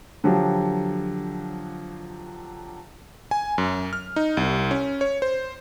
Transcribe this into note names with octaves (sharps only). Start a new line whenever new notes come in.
D3 F3 F#3 G4
G#5
F#2
F6
D#4
C2
C#4
C#5
C5